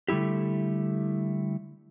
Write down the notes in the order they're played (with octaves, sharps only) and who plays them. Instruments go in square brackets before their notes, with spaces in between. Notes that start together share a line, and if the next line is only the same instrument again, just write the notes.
[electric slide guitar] D3 G3 A3 E4 G4